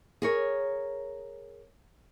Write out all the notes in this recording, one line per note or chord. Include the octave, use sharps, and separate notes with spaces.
G#4 A#4 C#5